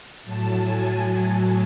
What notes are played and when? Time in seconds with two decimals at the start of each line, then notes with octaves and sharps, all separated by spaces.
0.24 A2 F#3 A5
0.58 G#5
0.90 A5
1.24 A5